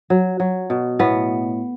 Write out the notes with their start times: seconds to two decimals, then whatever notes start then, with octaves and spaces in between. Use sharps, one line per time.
0.10 F#3
0.40 F#3
0.70 B2
0.99 A2 B3